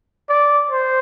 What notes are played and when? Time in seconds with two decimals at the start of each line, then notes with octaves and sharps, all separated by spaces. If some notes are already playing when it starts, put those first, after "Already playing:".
0.29 D5
0.71 C5